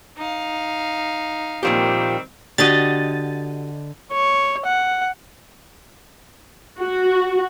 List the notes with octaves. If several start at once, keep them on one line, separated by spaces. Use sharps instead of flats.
D#4 F5
A#2 D#3 F3 G3 C4 G4
D3 F#4 G4 D#5 A6
C#5
F#5
F#4